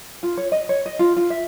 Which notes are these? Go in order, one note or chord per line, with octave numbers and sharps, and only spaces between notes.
F4
C#5
D#5
C#5
D#5
F4
F4
E5